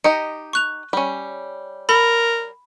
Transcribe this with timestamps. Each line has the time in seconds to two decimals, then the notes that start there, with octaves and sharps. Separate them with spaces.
0.04 D#4 G4 D#5 C#7
0.53 C#6 F#6 F7
0.93 G3 C#4
1.89 A#4 B5